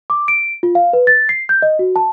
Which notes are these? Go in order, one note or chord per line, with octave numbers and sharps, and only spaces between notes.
D6
D7
F4
F5
B4
A6
C7
G6
D#5
F#4
A5